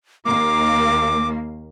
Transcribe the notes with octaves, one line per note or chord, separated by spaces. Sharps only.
D#2 A#3 D6